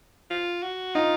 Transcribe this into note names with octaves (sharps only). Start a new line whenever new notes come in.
F4
F#4
D#4 F4 D#5